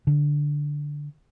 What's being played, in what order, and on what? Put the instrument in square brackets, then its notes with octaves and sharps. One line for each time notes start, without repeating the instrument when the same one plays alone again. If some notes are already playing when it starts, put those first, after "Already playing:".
[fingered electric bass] D3